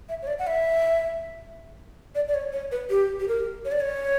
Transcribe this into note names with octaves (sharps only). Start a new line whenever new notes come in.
E5
C#5
D5
F#5
E5
D5
D5
C#5
C#5
B4
G4
G4
A#4
C#5
D5
C#5